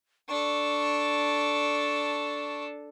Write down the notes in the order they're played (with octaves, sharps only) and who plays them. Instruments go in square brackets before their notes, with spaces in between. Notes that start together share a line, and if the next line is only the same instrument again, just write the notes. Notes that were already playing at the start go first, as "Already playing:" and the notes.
[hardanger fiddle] D4 A4 [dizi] C#6